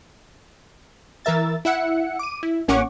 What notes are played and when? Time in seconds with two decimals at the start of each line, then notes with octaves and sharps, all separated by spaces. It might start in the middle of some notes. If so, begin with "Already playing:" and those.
1.25 E3 A#4 E5 A6
1.65 E4 E5 F#5 C#7
2.19 D6 D#7
2.43 E4
2.68 A1 A#3 C#4 F#5 C#6 D6